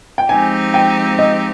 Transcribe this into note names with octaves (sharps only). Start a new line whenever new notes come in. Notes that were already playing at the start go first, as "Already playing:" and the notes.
G5
F3 G#3 C4 D#4 G4 G#5
G5
D#5